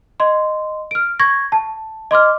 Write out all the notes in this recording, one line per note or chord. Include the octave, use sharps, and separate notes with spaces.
D#5 C6
F6 D7
C#6 G#6 A#6
A5
D#5 C6 D6 F6